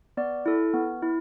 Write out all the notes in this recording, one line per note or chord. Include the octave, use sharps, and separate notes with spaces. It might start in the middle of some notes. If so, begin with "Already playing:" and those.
B3 D5
E4 A4
B3
E4